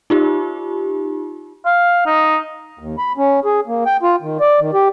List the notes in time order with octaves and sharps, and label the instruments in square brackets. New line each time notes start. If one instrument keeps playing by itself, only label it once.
[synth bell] D#4 F4 G4
[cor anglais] F5
D#4
[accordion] D#2
B5
C#4
G#4
A#3
G5
F4
D#3
D5
D#3
G4